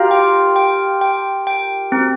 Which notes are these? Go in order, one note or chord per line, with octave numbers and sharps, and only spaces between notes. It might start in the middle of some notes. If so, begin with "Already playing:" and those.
Already playing: F4 G4 A#4 F5
G5
G5
G5
G5
C4 A#4